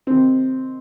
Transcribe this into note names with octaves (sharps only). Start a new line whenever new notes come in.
C3 D#3 C4